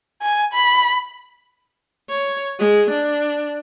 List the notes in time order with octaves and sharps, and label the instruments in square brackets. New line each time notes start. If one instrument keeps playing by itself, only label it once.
[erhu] G#5
B5
[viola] C#5
G#3
D4